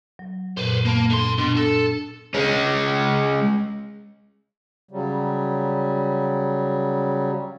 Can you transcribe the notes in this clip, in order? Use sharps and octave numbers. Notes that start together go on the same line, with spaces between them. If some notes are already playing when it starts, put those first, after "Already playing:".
F#3
F#2 A#2 B4 C5
A#3 A5 B5
D3 C6
B2 D4
A4
G#3 C#4
C#3 F#3 G3